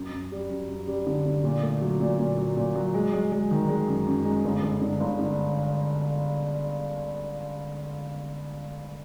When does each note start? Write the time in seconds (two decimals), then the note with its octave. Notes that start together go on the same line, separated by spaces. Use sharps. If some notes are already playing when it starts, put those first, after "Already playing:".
Already playing: F#2
0.12 F#2
0.32 G3
0.50 F#2
0.68 F#2
0.88 G3
1.06 D3
1.26 D3
1.44 A#2
1.63 A3
1.81 F#3
2.00 A#2
2.19 A#2
2.38 F#3
2.57 A#2
2.76 F#3
2.94 G#3
3.13 G#3
3.32 G#3
3.51 D#3
3.69 G#3
3.88 F#2
4.07 F#2
4.25 G#3
4.44 G1
4.63 G1
4.81 D3
5.00 G1
5.19 D3